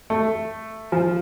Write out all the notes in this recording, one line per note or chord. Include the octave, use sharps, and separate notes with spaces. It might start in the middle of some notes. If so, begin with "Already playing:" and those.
A3
F3